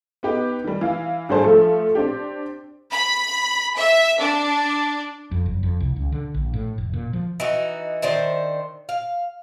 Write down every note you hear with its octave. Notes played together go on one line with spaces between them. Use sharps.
B3 D#4 G4 B4
D#3 G3
E3 F5
G#1 D3 G3 G#4 C5 A5
F3 A3 F4 A4
C4 D4 G4
B5
E5
D4
F2
F#1
F2
C2
C#2
D3
A#1
A2
F1
A#2
F3
E3 D#4 F#4
D#3 D4 C5 E5
F5